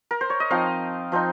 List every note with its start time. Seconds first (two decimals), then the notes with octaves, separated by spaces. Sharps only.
0.11 A#4
0.21 C5
0.30 C#5
0.40 D#5
0.50 F3 C4 D#4 F5
1.12 F3 C4 D#4